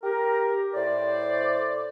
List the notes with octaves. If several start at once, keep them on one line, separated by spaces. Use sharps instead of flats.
G4 A#4
A2 C5 D5